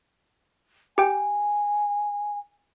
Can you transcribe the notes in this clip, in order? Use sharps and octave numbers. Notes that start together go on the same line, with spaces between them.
G4 G5 G#5